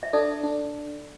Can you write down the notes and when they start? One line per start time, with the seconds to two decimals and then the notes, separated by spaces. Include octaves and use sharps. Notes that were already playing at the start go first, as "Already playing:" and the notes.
0.03 E5
0.13 D4 A4 D5
0.43 D4